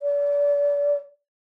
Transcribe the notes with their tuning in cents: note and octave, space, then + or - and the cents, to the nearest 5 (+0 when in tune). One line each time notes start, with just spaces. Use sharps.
D5 -35